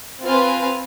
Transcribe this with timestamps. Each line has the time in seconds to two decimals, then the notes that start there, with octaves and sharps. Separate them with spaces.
0.23 C4 F4 B4 F5 G#5